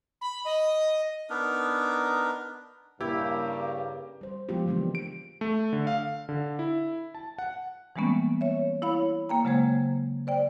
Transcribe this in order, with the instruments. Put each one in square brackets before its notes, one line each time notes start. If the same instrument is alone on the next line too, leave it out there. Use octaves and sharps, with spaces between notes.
[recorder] B5
D#5
[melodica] B3 D4 D#4 A#4
[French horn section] G2 C#3 A#3 [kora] E4 [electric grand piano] G4
[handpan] G3 C5
F3 F#3 G#3 B3 F4 G4
C#3 E3 G#3 A#3 D4
[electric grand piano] D7
A3
D3
F5
D3
E4
A5
F#5
[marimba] E3 G3 G#3 A#3 B3 C#4
C#5 E5
E4 C#5 F5 B5
A#3 G5 A#5
C#3 F#3 G#3 A#3 C5 G#6
C5 D5 G5